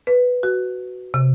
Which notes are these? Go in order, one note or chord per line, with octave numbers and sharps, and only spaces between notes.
B4
F#4
C3